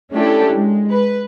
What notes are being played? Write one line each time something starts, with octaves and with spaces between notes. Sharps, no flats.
A3 C#4 D4 E4 G4 A4
G#3
B4